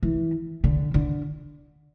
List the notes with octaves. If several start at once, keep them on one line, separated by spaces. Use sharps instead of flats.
E3
D3
D3